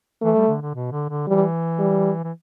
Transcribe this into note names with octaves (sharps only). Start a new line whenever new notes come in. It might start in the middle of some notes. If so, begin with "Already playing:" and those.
E3 A3
G3
D3
D3
B2
D3
D3
E3 G3
G3
E3